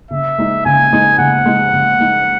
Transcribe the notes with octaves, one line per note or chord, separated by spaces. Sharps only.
C#3 E5
G#3 D#4
C#3 G#5
G#3 D#4
C#3 F#5
G#3 D#4
C#3
G#3 D#4